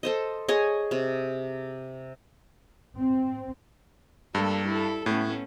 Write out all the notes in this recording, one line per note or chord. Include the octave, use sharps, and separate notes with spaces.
A4 C5 D#5
G#4 C#5 D#5
C3
C4
G2 G3 A#3 A4
E4 A4
A2 A3 B3 C#4